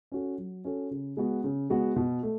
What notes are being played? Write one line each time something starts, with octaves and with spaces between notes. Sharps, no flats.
C#4 F#4 A4
F#3
C#4 F#4 A4
C#3
G#3 B3 F#4
C#3
G#3 B3 F#4
B2
A3